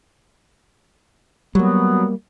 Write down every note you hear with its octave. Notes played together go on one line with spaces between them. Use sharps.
F#3 G3 A#3 B3